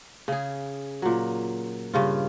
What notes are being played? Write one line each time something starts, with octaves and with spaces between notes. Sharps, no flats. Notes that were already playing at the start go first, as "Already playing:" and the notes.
C#3 G#4
A#2 F#3
G2 C#3 F4